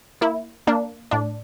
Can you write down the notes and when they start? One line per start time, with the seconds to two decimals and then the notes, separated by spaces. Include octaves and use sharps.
0.21 A#3 E4
0.67 A#3 D4
1.11 A2 D4